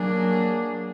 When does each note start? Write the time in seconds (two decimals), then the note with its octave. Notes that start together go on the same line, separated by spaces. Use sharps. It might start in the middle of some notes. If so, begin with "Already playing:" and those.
Already playing: F#3 A#3 D4 G#4